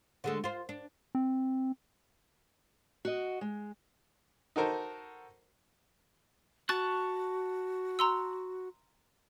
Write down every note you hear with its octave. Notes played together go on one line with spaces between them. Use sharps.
D3 G#3 A3
F4 C5
D4
C4
F#4 D#5
G#3
D#4 F#4 A4 A#4 C5
F#4 A5 C#6 F#6 A6
A#5 C6 E6